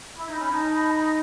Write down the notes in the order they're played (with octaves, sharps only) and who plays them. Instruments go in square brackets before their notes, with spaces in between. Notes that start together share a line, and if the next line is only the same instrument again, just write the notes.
[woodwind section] E4 [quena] B5
[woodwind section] D#4
[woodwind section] C#4 [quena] B5
[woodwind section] D#4 [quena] A5
[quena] B5
A5
B5